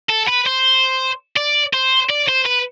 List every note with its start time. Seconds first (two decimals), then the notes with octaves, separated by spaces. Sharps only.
0.10 A4
0.28 B4
0.47 C5
1.36 D5
1.73 C5
2.09 D5
2.28 C5
2.45 B4